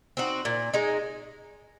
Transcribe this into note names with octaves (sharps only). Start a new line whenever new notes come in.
C4 D#4 F#4
A#2
G#3 D#4